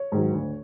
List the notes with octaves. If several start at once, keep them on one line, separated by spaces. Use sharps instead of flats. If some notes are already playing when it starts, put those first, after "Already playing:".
Already playing: C#5
G#2 D#3 F#3
D2